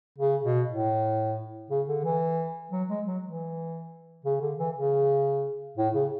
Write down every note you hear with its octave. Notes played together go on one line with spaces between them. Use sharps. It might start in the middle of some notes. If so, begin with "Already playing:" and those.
C#3
B2
A2
C#3
D3
E3
F#3
G#3
F#3
E3
C#3
D3
E3
C#3
A2
C#3